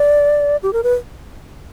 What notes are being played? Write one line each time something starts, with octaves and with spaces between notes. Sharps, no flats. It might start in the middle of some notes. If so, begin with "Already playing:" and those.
Already playing: D5
G4
A#4
B4